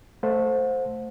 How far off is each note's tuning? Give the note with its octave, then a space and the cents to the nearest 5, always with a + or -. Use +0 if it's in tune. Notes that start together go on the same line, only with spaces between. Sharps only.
A3 +0 C5 +0 F#5 -40